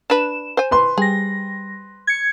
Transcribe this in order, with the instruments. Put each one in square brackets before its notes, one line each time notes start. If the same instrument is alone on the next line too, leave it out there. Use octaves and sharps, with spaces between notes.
[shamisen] D4 B4 [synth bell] E7
[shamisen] C5 G#5
[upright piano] B4 C6
[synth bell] G3 A#6 [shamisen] G#4
[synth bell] G#6 C#7